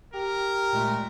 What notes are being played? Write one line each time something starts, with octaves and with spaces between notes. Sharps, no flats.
G4 A#4
A#2 G#3 A3